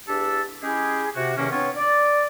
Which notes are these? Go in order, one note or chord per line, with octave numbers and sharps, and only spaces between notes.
E2 D4 G4 A4 A5 E6
G#3 C#4 E4 G4 G#4
C3 F#4
E2 C3 D#3 A#3 C#4
B3 C4 D4 F4 C#5
D5